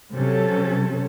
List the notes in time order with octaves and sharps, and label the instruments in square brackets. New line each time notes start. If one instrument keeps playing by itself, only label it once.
[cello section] C3 F#3 C#4 A4